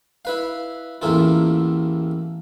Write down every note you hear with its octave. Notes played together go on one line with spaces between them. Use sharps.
E4 B4 F5
A1 E2 A2 A#3 E4 F4